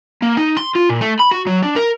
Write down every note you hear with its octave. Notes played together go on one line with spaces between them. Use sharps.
A#3
D#4
C6
F4
A#2
A3
B5
F#4
F#3
D4
A#4